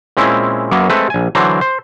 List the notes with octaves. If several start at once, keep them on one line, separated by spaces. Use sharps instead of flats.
A#2 G#3 C4 C#4 E4
F#2 F#3 A#3 B3
G#3 A3 C4 A4 B4
A#1 G#5
D3 E3 F#3 D4 C5 A#5
C5